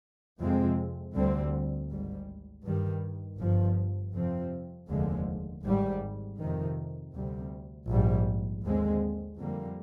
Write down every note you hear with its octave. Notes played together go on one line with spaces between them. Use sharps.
F2 C3 F3 G#3 C4
D2 D3 G3 C4
G#1 G#2 G3
G2 D#3 G3
G1 G2 F3
F2 C3 F3 C4
F1 D#2 D3 F3 G#3
G#1 G#2 G3
F2 C3 D#3
D2 C3 G3
A#1 G#2 G3
D#2 D3 G#3 C4
F2 D3 G3 A#3